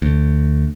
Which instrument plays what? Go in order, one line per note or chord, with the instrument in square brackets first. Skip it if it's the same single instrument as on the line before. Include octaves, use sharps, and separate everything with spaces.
[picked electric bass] D2